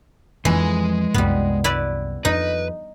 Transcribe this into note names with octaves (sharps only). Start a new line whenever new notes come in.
F2 E3 F3 G#3 G#5
C2 F#2 G3 B3
E4 B4 D5
F2 D#4 B4